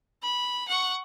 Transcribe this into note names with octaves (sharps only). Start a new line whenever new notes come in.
B5
F#5 C#6